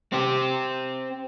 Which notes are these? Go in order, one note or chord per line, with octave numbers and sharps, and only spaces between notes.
C4 G4